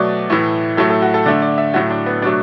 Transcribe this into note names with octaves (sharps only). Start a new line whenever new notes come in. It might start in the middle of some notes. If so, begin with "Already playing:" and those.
Already playing: B2 F#3 A3 D5
A2 E3 A3
A2 F#3 A3 A4
A4
F#4
A4
D3 A3 D5
D5
E5
A2 F#3 A3 F#4
D4
B3
B2 F#3 A3 D4